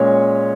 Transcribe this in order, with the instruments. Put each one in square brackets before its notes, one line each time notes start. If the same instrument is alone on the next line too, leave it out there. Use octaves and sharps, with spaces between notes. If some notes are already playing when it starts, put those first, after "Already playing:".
Already playing: [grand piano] A#2 G#3 C#4 C#5